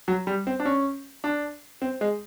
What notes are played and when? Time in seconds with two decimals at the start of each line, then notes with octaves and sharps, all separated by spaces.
0.08 F#3
0.27 G3
0.47 C4
0.60 D4
0.65 C#4
1.24 D4
1.82 C4
2.01 G#3